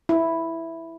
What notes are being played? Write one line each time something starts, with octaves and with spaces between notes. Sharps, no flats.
E4